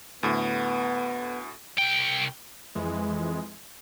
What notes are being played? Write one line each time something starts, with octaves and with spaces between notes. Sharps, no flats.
D2 A2 B3
C2 G5
F2 E3 G#3